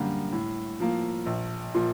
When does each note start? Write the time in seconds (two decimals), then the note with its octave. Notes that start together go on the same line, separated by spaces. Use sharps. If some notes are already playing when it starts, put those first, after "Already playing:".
Already playing: F#2 D3 G3 A#3
0.32 A2
0.80 F3 A#3
1.26 A#1
1.74 A#2 F3